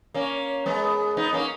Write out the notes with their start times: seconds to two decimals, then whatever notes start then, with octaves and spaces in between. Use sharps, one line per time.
0.14 A#3 C#4
0.66 G#3 B3
1.17 B3 D#4
1.33 A#3 C#4